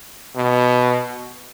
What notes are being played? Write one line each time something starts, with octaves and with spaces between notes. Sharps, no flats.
B2